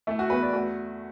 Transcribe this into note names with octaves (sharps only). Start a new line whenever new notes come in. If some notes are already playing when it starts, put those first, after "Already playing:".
A3 E4
F#4
E2 B4
D5
A3 F#4